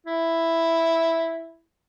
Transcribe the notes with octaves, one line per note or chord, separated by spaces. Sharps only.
E4